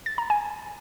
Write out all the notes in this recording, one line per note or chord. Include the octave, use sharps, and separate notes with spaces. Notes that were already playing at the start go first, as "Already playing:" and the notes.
A6
A#5
G#5